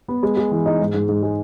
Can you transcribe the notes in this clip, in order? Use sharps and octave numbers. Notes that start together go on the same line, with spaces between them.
B3
G#3
G#3
E3
D#4
G#2
G#2
G#2
G#3